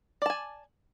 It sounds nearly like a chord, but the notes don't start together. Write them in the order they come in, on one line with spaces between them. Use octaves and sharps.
D5 A5 G#5